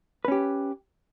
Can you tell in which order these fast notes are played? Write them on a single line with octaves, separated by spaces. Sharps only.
B4 C#4 G4